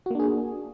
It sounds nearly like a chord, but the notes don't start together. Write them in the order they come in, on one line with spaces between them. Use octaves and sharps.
F#4 A#3 D4 G#4